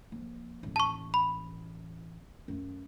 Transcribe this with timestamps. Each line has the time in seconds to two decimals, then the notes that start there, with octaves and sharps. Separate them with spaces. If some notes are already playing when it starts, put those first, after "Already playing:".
0.12 F3 A#3
0.63 A1 D#2
0.76 A5 C#6
1.14 B5
2.48 F#2 A3